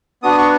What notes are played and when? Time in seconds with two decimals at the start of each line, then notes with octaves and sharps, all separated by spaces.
0.23 B3 D4 F#4 D#6
0.38 C#6